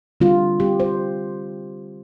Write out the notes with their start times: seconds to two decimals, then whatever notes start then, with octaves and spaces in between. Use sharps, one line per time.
0.20 D3 G3 C4 F4
0.60 D3 G3 C4 G4
0.80 C5